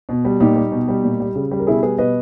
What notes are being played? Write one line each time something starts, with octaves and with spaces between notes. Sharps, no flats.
B2
G3
A#2 D#4 G4
G3
B2
G3
A#2
G3
C#3
G3
A#4
B2 E4 G#4
G3 G#4 B4
B2 B4 D#5